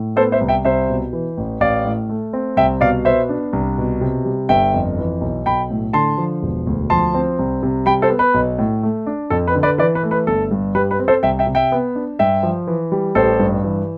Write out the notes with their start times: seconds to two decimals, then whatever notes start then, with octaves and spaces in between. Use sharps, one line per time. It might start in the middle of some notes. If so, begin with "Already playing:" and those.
Already playing: A2
0.16 B3 A4 C5
0.32 C5 E5
0.41 C2
0.49 E5 G5
0.65 C2 C5 E5
0.89 B2
1.13 E3
1.38 A1
1.60 A1 D5 F5
1.85 A2
2.09 A3
2.33 C4
2.57 C2 E5 G5
2.81 B2 D5 F5
3.05 B3 C5 E5
3.29 D4
3.53 C2
3.78 B2
4.01 C3
4.25 G3
4.49 G1 E5 G5
4.74 F2
4.98 E3
5.21 B1
5.46 B1 G5 B5
5.71 A2
5.93 D3 A5 C6
6.18 F3
6.42 E1
6.67 D2
6.90 F3 A5 C6
7.14 C4
7.39 C2
7.63 C3
7.86 G3 G5 B5
8.02 A4 C5
8.10 B3
8.19 B4
8.34 B1
8.58 A2
8.83 A3
9.06 D4
9.30 F2 A4
9.47 B4
9.55 D3
9.63 B4 D5
9.78 E3 B4 D5
9.95 B4
10.03 A3
10.11 B4
10.27 G1 A4
10.51 G2
10.75 G3 B4
10.91 B4
10.99 C4
11.08 A4 C5
11.23 C2 E5 G5
11.39 E5 G5
11.47 C3
11.55 E5 G5
11.72 B3
11.95 D4
12.19 G2 E5 G5
12.43 F3
12.67 E3
12.92 G3
13.15 A1 A4 C5
13.40 G2
13.64 E3